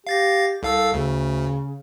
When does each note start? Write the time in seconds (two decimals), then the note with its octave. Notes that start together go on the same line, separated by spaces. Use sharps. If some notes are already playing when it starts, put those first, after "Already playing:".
0.07 G4 F5 A6 A#6
0.63 C2 A4 F5 E6
0.94 D2 C#3